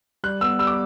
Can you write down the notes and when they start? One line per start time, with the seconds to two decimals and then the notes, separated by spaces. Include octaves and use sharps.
0.24 G3 F#6
0.41 B3 E6
0.59 G3 E6
0.67 D6